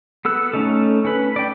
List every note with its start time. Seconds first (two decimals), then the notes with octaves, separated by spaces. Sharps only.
0.25 B3 A4 E6 F#6
0.53 A3 C#4 D#4 A4
1.05 C#4 B4
1.36 D5 G5